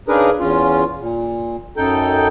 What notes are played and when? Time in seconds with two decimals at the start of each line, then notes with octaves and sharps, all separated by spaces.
0.08 C#3 D4 D#4 G#4 A#4 B4
0.40 E2 C#4 F4
1.01 A#2
1.77 F#2 D#4 A4 G5